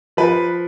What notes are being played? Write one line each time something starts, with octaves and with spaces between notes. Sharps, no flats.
F3 B4